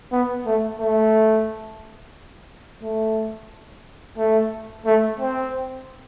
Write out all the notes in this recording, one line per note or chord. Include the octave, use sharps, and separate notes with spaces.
B3
A3
A3
A3
A3
A3
C4